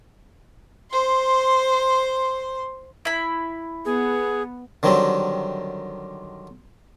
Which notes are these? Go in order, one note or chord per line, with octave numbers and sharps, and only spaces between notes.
C5 C6
E4 B5
B3 G#4
D3 D#3 F#3 G3 C4